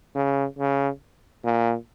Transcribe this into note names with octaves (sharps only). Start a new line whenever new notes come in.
C#3
C#3
A#2